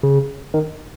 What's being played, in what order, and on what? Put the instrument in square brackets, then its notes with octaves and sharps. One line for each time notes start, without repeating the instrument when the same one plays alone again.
[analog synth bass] C#3
D#3